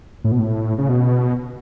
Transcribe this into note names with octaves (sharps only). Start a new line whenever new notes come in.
A2
B2
A2
C#3
B2